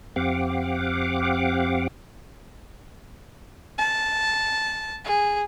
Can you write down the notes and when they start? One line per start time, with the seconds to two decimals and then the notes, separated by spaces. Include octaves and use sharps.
0.16 F2 C4 G4 F5 F#5 D6
3.78 A5
5.05 G#4